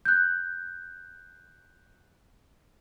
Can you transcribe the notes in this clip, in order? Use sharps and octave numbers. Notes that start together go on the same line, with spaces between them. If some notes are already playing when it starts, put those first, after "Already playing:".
F#6 G6